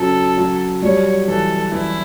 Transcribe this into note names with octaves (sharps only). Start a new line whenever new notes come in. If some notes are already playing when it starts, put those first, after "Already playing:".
Already playing: C#3 F#3 A4
F#3
G3 C#5
E3 A4
E3 E4